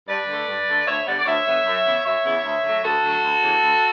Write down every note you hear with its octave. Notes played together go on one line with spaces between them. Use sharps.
G2 B4 D5
D3 A3
G2
D3 A3
D2 C#5 E5
D3 G3 B3 D5 F#5
D5
D2 C#5 E5
D3 G3 B3
F#2
C#3 E3 B3 E4
F#2 C#5 E5
C#3 E3 B3 E4
D2
D3 F#3 A3
D2 F#4 A4
D3 F#3 A3
D2
C#3 E3 B3
D2